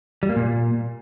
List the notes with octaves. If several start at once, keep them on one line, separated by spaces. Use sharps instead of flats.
G3
A#3
A#2